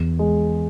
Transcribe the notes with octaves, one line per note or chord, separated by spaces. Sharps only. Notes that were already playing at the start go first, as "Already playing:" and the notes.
Already playing: E2
G#3